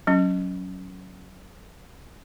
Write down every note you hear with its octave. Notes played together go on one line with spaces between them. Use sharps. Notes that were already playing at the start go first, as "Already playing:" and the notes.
F#3 C#4